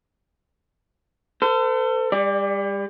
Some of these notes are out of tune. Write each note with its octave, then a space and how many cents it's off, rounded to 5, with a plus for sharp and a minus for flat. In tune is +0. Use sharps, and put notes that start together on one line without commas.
A4 +35 C5 -40
G3 +35 D5 +0